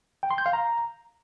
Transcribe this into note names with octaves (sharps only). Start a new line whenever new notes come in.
G5
C6
G6
F5
A#5